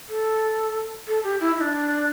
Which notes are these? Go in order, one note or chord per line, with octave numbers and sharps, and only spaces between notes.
A4
A4
G4
E4
E4
D4